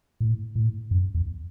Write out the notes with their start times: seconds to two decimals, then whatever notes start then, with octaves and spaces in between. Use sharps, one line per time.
0.20 A2
0.56 A2
0.91 F#2
1.15 E2